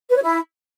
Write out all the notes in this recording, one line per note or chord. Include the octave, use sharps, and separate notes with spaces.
B4
C#5
E4